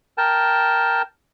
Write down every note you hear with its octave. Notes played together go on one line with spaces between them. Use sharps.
A#4 G5 A5